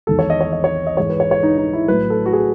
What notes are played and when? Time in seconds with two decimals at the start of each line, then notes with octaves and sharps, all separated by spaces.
0.07 E2 D#3 G#3 A4
0.19 C#5
0.30 D#5
0.41 C#5
0.52 D#5
0.64 C#5
0.87 D#5
0.97 G#2 E3 G#3 C#5
1.10 B4
1.20 C#5
1.31 C#5
1.43 D#4
1.58 D#4
1.73 E4
1.88 A2 F#3 B4
2.10 A4
2.26 F#4
2.33 G#4